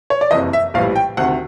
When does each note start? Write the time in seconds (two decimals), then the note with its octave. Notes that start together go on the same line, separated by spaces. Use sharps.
0.10 C#5
0.21 D5
0.31 F#1 F2 C3 E3 D#5
0.53 E5
0.74 A#1 A2 E3 G3 F5
0.96 G5
1.17 D2 C3 D#3 F#5